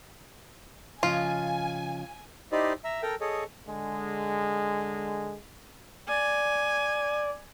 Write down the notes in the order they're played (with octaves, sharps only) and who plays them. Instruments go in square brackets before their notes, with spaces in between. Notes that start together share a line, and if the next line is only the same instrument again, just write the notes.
[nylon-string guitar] C#3 F3 D#5 [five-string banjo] F4 [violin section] G#5
[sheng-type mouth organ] D#4 E4 G4 C5 D5 D#5
E5 A#5
A4 A#4 G5 A#5
G#4 A4 C#5 D#5
[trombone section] D3 G#3
[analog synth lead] D5 [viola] G#5